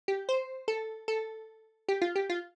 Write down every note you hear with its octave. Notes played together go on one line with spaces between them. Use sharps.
G4
C5
A4
A4
G4
F4
G4
F4